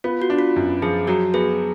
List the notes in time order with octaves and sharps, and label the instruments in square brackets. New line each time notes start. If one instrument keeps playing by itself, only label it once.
[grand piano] B3 [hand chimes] F4
[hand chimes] F#4
[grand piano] D4
[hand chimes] F4
[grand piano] F#2
[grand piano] F3 [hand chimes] G#4
[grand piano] F#3 [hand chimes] F#4
[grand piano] B3 [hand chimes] G#4